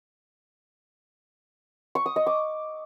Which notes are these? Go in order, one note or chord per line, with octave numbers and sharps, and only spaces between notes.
C#6
D#6
D#5
D6